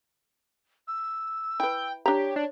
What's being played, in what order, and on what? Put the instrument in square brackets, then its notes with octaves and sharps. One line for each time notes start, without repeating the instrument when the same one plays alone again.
[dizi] E6
[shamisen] E4 B4 [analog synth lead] G5
[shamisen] D4 A#5 [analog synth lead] G4 [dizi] C#5
[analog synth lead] D4